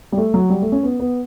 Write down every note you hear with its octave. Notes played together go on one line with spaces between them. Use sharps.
G3
A3
F#3
G3
A3
C#4
B3
B3